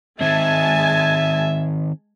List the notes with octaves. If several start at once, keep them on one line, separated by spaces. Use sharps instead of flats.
D#3 G#3 C4 E5 G#5 A5